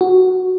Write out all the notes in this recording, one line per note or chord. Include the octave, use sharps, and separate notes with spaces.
F#4